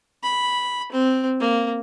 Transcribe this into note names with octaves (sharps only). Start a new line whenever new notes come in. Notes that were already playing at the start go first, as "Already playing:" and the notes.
B5
C4
A#3